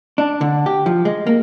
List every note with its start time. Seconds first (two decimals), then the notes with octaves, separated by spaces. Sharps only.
0.18 D4
0.41 D3
0.66 G4
0.86 F3
1.05 G#3
1.27 A#3